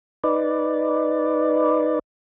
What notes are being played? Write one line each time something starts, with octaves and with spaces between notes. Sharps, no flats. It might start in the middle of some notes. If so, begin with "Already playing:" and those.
D#4 B4 D5